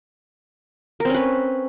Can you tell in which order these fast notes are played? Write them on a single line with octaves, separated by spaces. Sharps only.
A#4 C4 C#4 B4